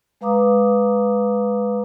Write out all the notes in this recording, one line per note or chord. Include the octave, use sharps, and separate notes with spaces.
G#3 B4 F5 A#5 D6 D#6